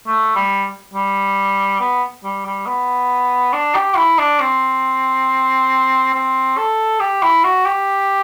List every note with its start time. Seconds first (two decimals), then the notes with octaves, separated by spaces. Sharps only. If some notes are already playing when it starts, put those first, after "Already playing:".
0.06 A3
0.36 G3
0.93 G3
1.80 B3
2.23 G3
2.46 G3
2.66 B3
3.53 D4
3.75 G4
3.96 E4
4.18 D4
4.40 C4
6.14 C4
6.57 A4
7.00 G4
7.22 E4
7.44 F#4
7.65 G4